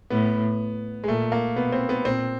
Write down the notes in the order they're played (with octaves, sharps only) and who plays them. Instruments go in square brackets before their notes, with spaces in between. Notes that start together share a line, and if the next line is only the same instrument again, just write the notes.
[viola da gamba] A2 [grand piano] B3
[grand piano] G#3
[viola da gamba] A#2 [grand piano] A3
[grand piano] A#3
[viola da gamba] B2 [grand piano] B3
[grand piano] C4
B3
[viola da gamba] A#2 [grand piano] C4